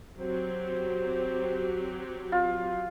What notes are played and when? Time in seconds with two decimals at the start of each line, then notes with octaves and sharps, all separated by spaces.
0.18 F#3 C4 G4 C5
2.32 F4